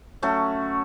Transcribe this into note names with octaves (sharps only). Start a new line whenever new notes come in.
F#3 A3 C#4 F#4